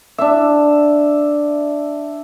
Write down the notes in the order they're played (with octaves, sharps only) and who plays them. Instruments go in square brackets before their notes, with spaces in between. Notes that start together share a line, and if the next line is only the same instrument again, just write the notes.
[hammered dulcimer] D4 E5